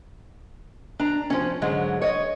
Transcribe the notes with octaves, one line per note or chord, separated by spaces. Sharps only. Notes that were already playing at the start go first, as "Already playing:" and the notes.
D4 A#5
F3 C#4
G#2 D3 F#3 G#3
C#5 D#5